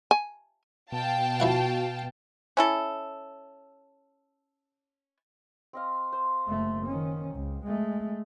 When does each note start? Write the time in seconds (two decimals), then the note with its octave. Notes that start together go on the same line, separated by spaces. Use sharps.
0.11 G#5
0.92 B2 F5 G5 A5
1.40 F3 E4 F#4 F#5
2.57 C#4 E4 A4
5.73 C4 D#5 F5
6.13 C5
6.48 F#1 A3
6.86 D#3 C#4
7.35 C#2
7.64 G#3 A3